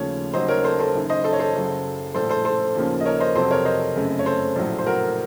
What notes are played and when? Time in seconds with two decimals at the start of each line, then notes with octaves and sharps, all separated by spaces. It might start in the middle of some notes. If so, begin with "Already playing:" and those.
Already playing: D#2 C#3 F3 A3 C#5
0.34 D#2 C#3 F#3 C5 D#5
0.49 A#4 C#5
0.64 A4 C5
0.79 A4 C5
0.94 F#1 F#2 D#3
1.10 C5 D#5
1.24 A4 C5
1.33 C#5
1.39 A4 C5
1.54 F#1 F#2 C#3 F#3
2.14 A#1 A2 A3 A4 C5
2.29 A4 C5
2.45 A4 C5
2.75 D#2 C#3 F3 A#3 C#4
3.01 D#5
3.05 A#4 C#5
3.20 C5 D#5
3.35 F2 C3 F#3 C4 A4 C5
3.51 A#4 C#5
3.65 C5 D#5
3.96 F#1 F#2 C#3 A3 C4
4.19 C#5
4.26 A4 C5
4.56 A#1 A2 F#3
4.78 C5
4.86 F#4 A#4